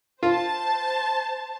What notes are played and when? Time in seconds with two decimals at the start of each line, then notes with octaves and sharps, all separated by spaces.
0.23 F4 C5 A5